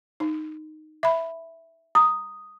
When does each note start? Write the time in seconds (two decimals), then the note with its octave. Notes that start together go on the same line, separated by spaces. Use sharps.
0.20 D#4
1.03 E5 B5
1.95 A#5 D#6